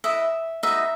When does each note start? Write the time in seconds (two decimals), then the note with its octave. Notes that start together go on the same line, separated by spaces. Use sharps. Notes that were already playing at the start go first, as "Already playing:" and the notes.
0.04 E4 B4 D#5 E5
0.63 D#4 F#4 B4 D#5 E5